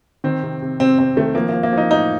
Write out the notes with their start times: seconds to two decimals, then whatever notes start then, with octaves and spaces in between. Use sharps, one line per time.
0.24 D#3 C4
0.43 C3
0.62 C3
0.80 C3 C4
0.98 C3 C4
1.16 D#3 A3
1.35 F3 A#3
1.49 F3 A#3
1.63 A#3
1.73 F3 D#4
1.91 A2 D#4